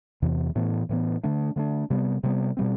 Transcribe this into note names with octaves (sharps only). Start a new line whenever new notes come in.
E2 C3 E3
A2 E3 B3
A2 E3 B3
D3 A3 D4
D3 A3 D4
C3 G3 B3
C3 G3 B3
B2 G3 C4